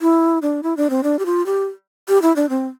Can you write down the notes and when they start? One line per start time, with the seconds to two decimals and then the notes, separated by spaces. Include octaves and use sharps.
0.01 E4
0.42 D4
0.63 E4
0.77 D4
0.90 C4
1.03 D4
1.19 G4
1.26 F4
1.46 G4
2.09 G4
2.22 E4
2.36 D4
2.49 C4